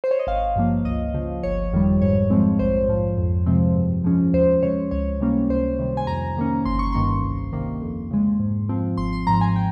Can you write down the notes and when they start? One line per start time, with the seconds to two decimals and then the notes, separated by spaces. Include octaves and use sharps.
0.04 C5
0.11 C#5
0.19 D#5
0.27 G#1 F5
0.56 G2 F3 A#3
0.85 C#2 D#5
1.14 C#3 F3
1.43 G1 C#5
1.73 F2 D#3 G3
2.02 G#2 C#5
2.30 F3 G#3 C4
2.59 A#1 C5
2.88 G#2 F3
3.18 F2
3.46 C3 F3 G#3 C4
3.75 G2
4.04 F3 G#3 C#4
4.33 D#2 C5
4.63 C#3 G#3 C#5
4.91 C#2 C#5
5.20 C3 G3 A#3 C#4
5.49 C#2 C5
5.79 C3 D#3 G3
5.97 G#5
6.07 F2 A#5
6.37 D#3 A#3 C#4
6.65 G1 C6
6.79 C#6
6.92 G2 D#3 A#3 C6
7.24 C2
7.53 C3 D#3 A#3
7.82 F2
8.11 C#3 G#3
8.40 G#2
8.69 F3 C4
8.98 G#1 C6
9.13 C6
9.27 G#2 F3 A#5
9.41 G#5
9.56 G5